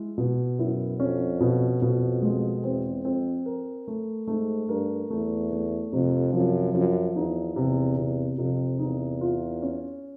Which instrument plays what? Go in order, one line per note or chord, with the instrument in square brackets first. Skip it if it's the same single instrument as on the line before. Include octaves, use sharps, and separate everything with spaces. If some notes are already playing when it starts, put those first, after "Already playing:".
Already playing: [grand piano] G#3 E4
B2
[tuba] F#2 [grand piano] E4
[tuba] F2 [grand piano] C#4
[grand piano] B2
[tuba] F2 [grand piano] B2
[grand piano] G#3
[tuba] E2 [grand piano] C4
[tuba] F2 [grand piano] C4
[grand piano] A#4
A3
[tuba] G#2 [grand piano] A3
[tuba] G2 [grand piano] A#4
[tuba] E2 [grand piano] A3
[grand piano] A3
[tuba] F2 [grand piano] C3
[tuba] F#2 [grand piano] F3
[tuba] F#2 [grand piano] F3
[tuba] E2 [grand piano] D#4
[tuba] E2 [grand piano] C3
[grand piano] C3
[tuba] F2 [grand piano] C3
[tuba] E2 [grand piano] D#4
[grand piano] F4
C#4